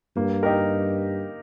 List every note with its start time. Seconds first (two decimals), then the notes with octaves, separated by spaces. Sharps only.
0.16 G2 A#3
0.43 D#4 G4 A#4